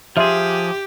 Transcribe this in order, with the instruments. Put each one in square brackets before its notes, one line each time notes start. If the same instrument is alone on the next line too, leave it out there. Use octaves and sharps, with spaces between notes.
[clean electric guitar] F3 G#4 [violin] G4 [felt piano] E5 C6